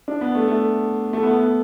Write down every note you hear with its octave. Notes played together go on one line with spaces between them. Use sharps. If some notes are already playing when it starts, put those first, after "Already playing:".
D4
B3
A3
A3
A3
B3
A3
B3